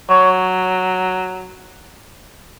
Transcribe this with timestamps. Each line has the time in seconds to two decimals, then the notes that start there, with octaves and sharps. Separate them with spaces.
0.10 F#3 C#5